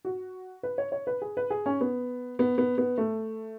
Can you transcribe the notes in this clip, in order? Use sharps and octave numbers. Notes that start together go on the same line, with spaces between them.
F#4
B4
C#5
C#5
B4
G#4
B4
G#4
C#4
B3
B3
B3
B3
A3